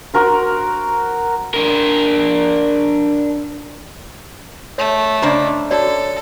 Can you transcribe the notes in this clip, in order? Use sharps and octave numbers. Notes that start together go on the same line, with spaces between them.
F#4 A#4 C5
D4 A#4
A3 C#5
C#3 D4 C5 D5 D#5 A#5
F#4 A4 C#5 D5